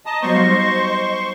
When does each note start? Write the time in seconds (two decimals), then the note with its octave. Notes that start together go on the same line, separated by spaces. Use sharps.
0.06 D#5 A5 A#5
0.22 F#3 G3 B3 C5 D#5 C6 C#6
0.35 G3 D#4 F5